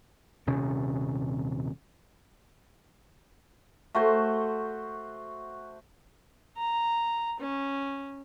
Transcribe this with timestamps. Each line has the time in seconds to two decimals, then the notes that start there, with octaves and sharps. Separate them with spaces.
0.47 D#1 C3 C#4
3.95 A3 F#4 C5
6.57 A#5
7.40 C#4